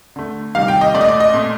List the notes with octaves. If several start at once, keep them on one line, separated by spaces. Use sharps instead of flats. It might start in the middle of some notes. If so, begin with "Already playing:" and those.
D3 A3
C3 D#3 G3 F5
G5
D#5
A#2 A3 D5
D#5
D5
D#5
A#2 A3